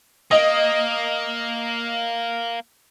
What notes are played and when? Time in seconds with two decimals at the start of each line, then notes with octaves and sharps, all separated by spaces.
0.31 A#3 D#5